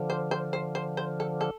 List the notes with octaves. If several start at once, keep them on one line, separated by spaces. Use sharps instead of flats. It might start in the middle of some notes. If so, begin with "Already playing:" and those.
Already playing: D3 F3
C5
C5
C5
C5
C5
A4
A4